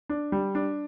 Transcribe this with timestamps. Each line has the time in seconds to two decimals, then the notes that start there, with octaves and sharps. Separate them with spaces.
0.09 D4
0.32 G3
0.55 D4